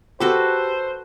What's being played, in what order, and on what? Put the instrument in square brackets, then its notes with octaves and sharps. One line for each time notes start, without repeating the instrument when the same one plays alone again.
[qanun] F#4 A4 B4 [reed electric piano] G4 [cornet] C5